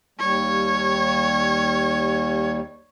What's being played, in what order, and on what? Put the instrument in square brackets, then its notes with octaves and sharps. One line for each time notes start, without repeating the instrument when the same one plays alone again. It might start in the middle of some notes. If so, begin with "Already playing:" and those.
[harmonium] D#2 G3 [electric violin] C#5